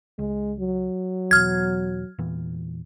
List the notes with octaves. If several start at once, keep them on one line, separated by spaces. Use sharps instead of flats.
C#2 G#3
F#3
E2 B2 F6 G#6
E2 A#2 E3